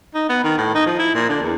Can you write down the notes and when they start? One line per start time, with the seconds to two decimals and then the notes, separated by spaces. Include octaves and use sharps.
0.14 D#4
0.29 B3
0.44 D#3
0.58 A2
0.74 D#4
0.86 F3
0.98 E4
1.15 A#2
1.29 D3
1.42 E2